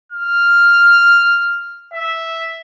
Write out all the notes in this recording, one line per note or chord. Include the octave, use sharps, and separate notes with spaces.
F6
E5